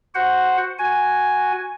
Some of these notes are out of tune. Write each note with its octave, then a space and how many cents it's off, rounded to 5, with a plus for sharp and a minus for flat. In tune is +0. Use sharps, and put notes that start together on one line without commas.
F#4 +0 C5 +0 F#5 +0
F#4 +0 G#5 +0